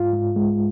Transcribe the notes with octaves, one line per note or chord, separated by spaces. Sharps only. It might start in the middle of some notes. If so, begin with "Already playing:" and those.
Already playing: G#2 F4
G#2
G#3